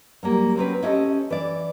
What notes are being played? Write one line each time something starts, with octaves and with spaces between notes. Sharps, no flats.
F#3 G3 A#3
F#3 C4 C#4 B4
C#4 E4 G4 A4 D#5
E3 D5